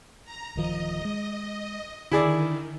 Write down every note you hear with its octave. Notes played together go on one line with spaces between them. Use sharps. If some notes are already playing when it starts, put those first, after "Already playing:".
A#5
D1 D#3 F3 D#5
G#3
D3 D#3 E4 G#4 D5